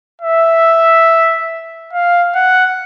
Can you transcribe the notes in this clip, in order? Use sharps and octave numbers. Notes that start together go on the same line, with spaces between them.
E5
F5
F#5